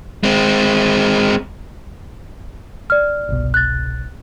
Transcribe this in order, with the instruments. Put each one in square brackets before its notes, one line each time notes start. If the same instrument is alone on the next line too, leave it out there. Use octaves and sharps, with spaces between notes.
[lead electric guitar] G#3 C4
[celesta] D5 F6
[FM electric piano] G1 C2 B2
[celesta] F#6 A6